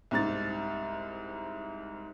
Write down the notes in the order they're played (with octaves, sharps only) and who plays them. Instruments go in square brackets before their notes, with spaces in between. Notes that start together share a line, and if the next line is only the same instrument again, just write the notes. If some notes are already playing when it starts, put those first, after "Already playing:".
[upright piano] C2 G#2 A6